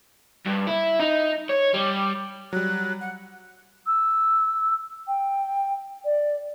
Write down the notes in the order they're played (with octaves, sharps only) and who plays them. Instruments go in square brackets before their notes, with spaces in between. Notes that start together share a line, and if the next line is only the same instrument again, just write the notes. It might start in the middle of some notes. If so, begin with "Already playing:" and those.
[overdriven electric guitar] G2
E4
D#4
C#5
G3
[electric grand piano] F#3 G3 [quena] F#6
[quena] F#5
[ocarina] E6
G5
D5